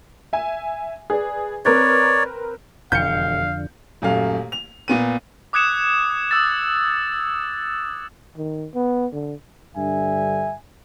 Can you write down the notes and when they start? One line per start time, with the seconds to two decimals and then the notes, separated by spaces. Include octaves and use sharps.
0.33 E5 G#5
1.10 G#4 B4 D5
1.65 C4 A#4 B4 C#5 D5
2.92 E1 F2 D3 F5 G6 C#7
4.02 D#1 F#2 A3 F5
4.52 F7
4.88 A#2 B3 D#7
5.53 D6 D#6 F#6 G#6 C#7 E7
6.31 D#6 E6 A6
8.37 D#3
8.74 B3
9.13 D3
9.77 G2 D3 E5 G#5